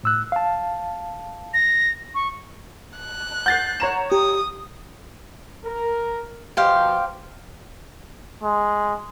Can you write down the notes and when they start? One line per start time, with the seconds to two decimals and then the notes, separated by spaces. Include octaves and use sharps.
0.03 A2 E6 F#6
0.32 F5 A5
1.54 A#6
2.15 C#6
2.98 F#6
3.46 F#5 G6 A6 C7
3.80 C#5 A#5 E7
4.12 G4 D#6
5.65 A#4
6.57 B2 F3 G4 C5 F5
8.43 G#3